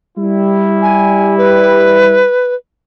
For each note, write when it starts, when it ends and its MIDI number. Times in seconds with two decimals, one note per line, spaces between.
0.18 2.23 55
0.18 2.23 64
0.82 1.37 80
1.38 2.55 71